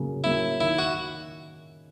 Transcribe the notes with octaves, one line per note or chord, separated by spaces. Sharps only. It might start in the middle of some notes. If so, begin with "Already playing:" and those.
Already playing: C#3 F#3 A#3 C#4
F#3 A#3 C#4 E4
D#3 E4
F#4